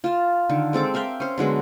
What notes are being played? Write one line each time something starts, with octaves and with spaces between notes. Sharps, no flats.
F4 A5
D3 D#3
G#3 C4 A4 D6
A#4 E5 F5 G5
C#4 C5
D3 F#3 G#3 B3